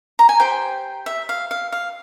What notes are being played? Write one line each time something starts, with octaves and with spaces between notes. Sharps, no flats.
A#5
G#5
G4 C5 G5
E5
F5
F5
F5